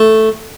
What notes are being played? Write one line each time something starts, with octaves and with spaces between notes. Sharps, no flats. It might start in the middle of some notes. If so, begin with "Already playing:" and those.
Already playing: A3